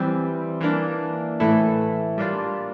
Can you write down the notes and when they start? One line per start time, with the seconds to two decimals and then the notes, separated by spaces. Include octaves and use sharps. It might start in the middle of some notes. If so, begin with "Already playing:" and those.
Already playing: E3 G3 C4
0.61 E3 A#3 D4
1.40 A2 E3 A3 E4 A4
2.18 G3 A#3 D4 F4